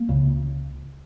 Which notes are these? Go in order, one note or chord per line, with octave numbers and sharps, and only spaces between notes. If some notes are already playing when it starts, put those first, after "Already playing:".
Already playing: A#3
C#2 C#3